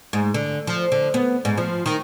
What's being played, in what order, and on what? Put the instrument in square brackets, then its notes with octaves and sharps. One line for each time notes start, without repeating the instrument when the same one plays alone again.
[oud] G#2
D3
F3
D3
B3
G#2
F3
D#3